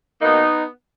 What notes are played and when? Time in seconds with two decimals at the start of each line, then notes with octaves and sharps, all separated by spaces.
0.21 B2 A#3 B3 D#4